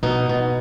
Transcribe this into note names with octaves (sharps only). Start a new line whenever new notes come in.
B2 D#4
B2